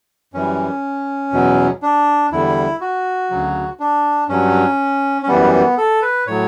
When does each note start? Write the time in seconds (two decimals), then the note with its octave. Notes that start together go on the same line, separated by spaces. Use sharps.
0.34 F#2 E3 G3 C#4
1.33 E2 B2 F#3
1.82 D4
2.32 E2 D3 G3 E4
2.81 F#4
3.30 D2 C#3 F#3
3.80 D4
4.29 G2 F#3 C#4
5.23 C#4
5.28 F#2 E3 G3 B3
5.53 B3
5.78 A4
6.02 B4
6.27 A2 F#3 C#5